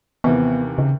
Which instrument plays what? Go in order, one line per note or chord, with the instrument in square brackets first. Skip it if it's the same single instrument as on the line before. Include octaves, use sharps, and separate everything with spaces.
[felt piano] D#2 C3 E3 [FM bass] B3
[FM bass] C#3